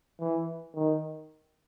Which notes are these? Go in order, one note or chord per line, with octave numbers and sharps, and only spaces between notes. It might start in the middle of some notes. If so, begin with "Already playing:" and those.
E3
D#3